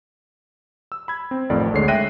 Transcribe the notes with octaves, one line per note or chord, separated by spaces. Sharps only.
E6
B5 G#6
C4
A1 F2 D#3 A3 D5
D2 D3 G#3 C#5 C7
E5 G5 F#6 A#6 D#7